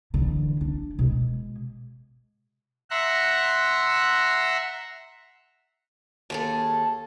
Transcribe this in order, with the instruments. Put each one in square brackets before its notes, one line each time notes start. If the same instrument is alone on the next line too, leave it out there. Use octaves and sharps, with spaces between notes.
[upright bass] D3 E3
D4
B2 G#3
[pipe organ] E5 F#5 A#5 C6 F#6
[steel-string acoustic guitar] D#2 G#4 A4